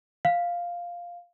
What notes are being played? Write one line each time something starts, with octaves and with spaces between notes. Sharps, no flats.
F5